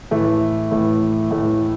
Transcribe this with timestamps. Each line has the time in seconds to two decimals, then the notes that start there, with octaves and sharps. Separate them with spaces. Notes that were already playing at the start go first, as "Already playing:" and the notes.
0.11 A2 E3 A3 E4
0.71 A2 E3 A3 E4
1.31 A2 E3 A3 E4